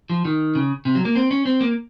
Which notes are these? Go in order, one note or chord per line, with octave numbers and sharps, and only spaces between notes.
F3
D#3
C#3
C3
F#3
A#3
C4
C#4
C4
A#3